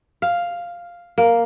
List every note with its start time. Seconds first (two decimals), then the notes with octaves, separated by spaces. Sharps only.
0.22 F5
1.18 A#3